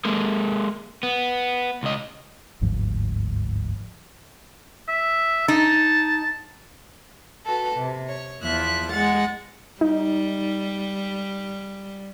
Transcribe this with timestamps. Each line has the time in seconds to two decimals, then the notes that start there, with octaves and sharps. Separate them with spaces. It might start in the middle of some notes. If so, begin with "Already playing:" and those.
0.05 G#3 A#3
1.03 B3
1.83 C#2 D#5
2.61 G1 D2 G#2 F3
4.88 E5
5.48 D#4 A5
7.44 F#4 A4 B4
7.76 C3
8.08 C#5
8.42 E2 F3 E5 F#6
8.91 G#3 F#5 A6
9.81 G3 D#4